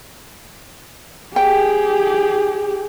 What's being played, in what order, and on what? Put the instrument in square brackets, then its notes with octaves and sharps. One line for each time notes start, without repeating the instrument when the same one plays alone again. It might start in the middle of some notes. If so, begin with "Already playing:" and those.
[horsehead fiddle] G4 G#4 [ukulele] G5